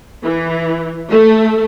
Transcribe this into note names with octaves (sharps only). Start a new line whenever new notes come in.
E3
A3